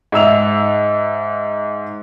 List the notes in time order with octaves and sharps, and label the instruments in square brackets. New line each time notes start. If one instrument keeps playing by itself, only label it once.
[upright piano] G#2 E5 E6 F7